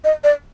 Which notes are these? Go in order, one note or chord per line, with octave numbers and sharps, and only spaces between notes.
D#5
D5